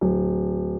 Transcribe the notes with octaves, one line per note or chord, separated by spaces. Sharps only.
D1